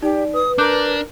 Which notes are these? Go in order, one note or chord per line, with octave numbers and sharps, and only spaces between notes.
D#4 G4 D5
B4 D#6
D4 A#4 D6 F#6 G6